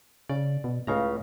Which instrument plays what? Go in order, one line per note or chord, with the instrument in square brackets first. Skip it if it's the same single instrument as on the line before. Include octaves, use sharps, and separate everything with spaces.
[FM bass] C#3 [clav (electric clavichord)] D5
[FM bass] B2
[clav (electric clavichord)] C#2 C#3 A#5 [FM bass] A2